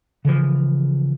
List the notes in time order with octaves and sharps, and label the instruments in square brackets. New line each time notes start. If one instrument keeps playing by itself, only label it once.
[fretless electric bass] C#3 E3 F3